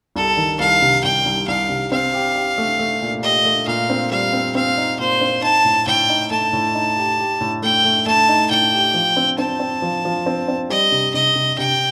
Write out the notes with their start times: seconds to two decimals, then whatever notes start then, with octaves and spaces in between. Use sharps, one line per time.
0.16 C2 A4
0.37 D#3
0.60 C2 F5
0.82 C3
1.03 C2 G5
1.26 C2
1.47 C2 F5
1.69 C3
1.91 C4 F5
2.13 G4
2.36 G4
2.58 A3
2.79 A3
3.02 A#2
3.23 G4 D#5
3.45 A3
3.67 A#2 F5
3.90 C4
4.11 G3 F5
4.33 C4
4.55 C4 F5
4.77 D#4
4.99 A#2 C5
5.21 C4
5.42 D#4 A5
5.65 A2
5.87 A2 G5
6.09 D#4
6.31 A3 A5
6.53 A2
6.74 D#4
6.97 G4
7.18 G4
7.41 A2
7.62 A3 G5
7.84 A3
8.06 A3 A5
8.29 D#4
8.50 A2 G5
8.73 G4
8.94 F3
9.17 C4
9.38 C4 A5
9.60 C4
9.82 F3
10.05 F3
10.26 C4
10.48 C4
10.70 G3 D#5
10.92 C3
11.14 C3 D#5
11.36 C3
11.58 C3 G5